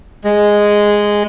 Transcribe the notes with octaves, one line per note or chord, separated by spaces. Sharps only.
G#3